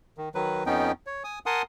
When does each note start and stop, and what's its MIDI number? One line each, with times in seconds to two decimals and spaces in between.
0.18 0.29 51
0.35 0.64 51
0.35 0.64 54
0.35 0.64 71
0.66 0.92 41
0.66 0.92 59
0.66 0.92 61
0.66 0.92 63
0.66 0.92 79
1.07 1.23 73
1.24 1.39 80
1.24 1.39 87
1.46 1.62 70
1.46 1.62 78
1.46 1.62 80
1.46 1.62 81
1.46 1.62 84
1.46 1.62 87